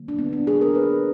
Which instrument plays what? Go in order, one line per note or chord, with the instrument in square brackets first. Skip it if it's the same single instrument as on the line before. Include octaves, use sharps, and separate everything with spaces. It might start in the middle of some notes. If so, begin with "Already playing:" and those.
Already playing: [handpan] D3 F#3 A#3
D4
B3
D4
G#4
A#4
B4